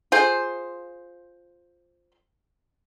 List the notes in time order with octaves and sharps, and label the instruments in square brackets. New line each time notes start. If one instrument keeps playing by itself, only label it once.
[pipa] F4 G#4 C5